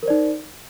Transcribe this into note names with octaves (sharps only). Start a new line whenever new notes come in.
D#4 A#4 C5 D5